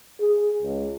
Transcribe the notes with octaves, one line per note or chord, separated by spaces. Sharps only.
G#4
C#2